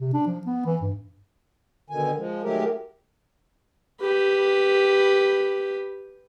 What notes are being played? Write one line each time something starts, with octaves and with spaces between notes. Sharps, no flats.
C3
D4
F3
B3
E3
G2
B2 D3 D#3 G#5
F3 G#3
D#3 F#3 G#3 A3 G4 A#4
G4 B4